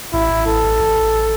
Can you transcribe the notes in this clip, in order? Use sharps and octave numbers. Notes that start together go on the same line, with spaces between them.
A1 E4
A1
A1 A4
A1
A1
A1